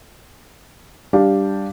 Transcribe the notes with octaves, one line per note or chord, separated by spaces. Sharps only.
G3 D4 G4 F5